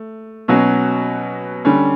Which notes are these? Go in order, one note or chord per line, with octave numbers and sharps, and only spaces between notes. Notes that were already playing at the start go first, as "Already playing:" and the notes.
Already playing: A3
B2 F#3 C#4 F#4
D3 G3 C#4